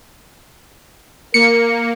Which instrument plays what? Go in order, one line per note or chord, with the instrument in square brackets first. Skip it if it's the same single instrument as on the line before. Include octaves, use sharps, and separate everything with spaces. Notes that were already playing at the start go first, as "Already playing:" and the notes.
[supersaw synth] A#3 [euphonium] A#4 [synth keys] C#7